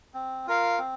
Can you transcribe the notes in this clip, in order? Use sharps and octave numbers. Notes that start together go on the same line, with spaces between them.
C4
F4 A#4 F5
C4